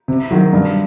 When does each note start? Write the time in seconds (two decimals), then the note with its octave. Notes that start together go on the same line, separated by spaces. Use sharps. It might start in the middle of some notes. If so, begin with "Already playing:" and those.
0.08 C3
0.31 D#3 F#3
0.53 G2